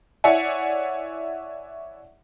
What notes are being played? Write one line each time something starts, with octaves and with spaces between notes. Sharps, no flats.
E4 C#5 D5 E5 F#5 G#5